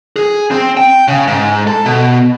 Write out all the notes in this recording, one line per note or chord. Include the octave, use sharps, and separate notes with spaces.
G#4
C4
G5
C#3
G#2
A4
B2